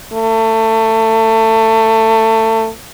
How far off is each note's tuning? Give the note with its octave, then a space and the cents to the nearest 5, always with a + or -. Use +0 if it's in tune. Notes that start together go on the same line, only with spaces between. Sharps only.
A3 +25